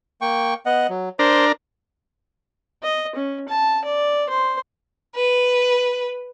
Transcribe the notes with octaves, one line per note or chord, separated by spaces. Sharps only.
A#3 G5 C#6
B3 D#5 F#5
F#3
D4 A#4 C5 C6
D#5
C#4
A5
D5
C5
B4